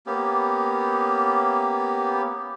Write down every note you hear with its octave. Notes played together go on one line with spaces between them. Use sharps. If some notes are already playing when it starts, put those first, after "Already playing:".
A#3 B3 C#4 G4